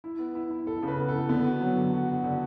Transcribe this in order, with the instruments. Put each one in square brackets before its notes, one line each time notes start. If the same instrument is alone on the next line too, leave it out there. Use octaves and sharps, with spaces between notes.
[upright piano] E4
B3
E4
E4
[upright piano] E4 [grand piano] A4
[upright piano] C#3 [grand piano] B4
[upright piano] B3
[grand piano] A4
[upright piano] E4
[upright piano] D3 [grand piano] B3
[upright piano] F#4
F#3
D3
F#4
F#4
D3